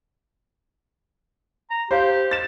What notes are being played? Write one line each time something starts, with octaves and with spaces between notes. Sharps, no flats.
A#5
G4 C5 F5
A6 E7